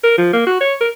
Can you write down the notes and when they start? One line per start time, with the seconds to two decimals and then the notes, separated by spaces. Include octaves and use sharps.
0.04 A#4
0.18 F3
0.33 A#3
0.47 F#4
0.61 C#5
0.81 A#4